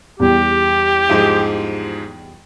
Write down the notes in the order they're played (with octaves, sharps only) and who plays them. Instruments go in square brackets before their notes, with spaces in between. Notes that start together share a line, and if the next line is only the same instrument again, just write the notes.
[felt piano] E2 G3 [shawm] G4
[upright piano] G#2 F3 G#3